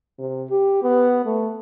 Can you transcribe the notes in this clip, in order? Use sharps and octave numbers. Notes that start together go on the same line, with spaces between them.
C3
G4
B3
A3